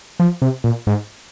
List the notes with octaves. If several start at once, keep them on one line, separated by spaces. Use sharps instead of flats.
F3
C3
A#2
G#2